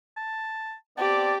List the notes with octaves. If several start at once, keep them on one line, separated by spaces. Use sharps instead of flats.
A5
B3 C4 G4 D5 A5 D6